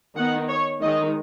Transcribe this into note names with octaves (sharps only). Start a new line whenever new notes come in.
D#3 B3 D#4 F#5
C#5
D#3 G#3 D#4 D#5